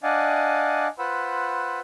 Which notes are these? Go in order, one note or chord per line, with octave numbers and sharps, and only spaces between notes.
D4 D5 D#5 F5 F#5 G#5
F4 B4 C5 F#5 B5 E6